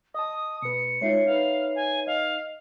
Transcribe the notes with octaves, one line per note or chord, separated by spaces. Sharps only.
D#5 A5 D#6
B2 B4 C#7
G#3 D#4 F4 C#5 E5 C7
D#4 B4 F5
G#5
D#5 F5